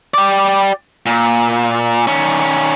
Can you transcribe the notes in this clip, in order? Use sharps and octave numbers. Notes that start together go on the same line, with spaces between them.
G4 D5
A#2
D#3 C#4